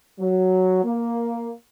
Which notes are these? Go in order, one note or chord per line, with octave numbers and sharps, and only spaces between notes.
F#3
A#3